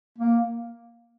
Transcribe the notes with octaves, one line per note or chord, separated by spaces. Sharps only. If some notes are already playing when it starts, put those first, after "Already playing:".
A#3